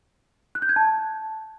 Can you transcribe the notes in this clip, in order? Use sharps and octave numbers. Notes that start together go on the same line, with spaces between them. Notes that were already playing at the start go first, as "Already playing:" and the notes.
F#6
G6
G#6
A5